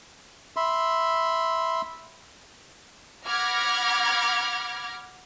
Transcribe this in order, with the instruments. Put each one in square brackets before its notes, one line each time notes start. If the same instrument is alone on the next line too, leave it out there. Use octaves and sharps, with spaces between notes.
[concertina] E5 B5 C6
[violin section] F#5 B5 D6 F6 G#6 A#6